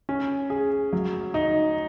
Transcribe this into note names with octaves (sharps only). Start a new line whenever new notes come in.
C#4
G#4
F#3
D#4